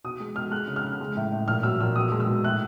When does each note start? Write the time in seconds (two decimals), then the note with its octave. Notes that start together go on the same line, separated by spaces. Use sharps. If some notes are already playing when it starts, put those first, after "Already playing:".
0.04 B2 D#6
0.20 G#3
0.36 B2 F6
0.51 G#3 F#6
0.67 C#3
0.76 F6
0.84 C#3
1.01 G#3
1.17 A2
1.32 A2
1.48 A#2 F6
1.63 F#3 E6
1.80 A#2 E6
1.96 B2 D#6
2.12 G#3
2.20 E6
2.28 B2
2.44 A2 F#6